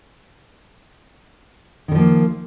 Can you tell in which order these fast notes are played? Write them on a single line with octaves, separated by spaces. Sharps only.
D#3 D3 F3 A#3